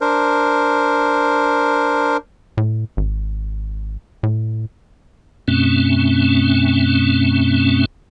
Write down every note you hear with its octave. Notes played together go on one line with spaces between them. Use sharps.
D4 A#4 C5
A2
G#1
A2
F#2 B2 A3 C4 C#4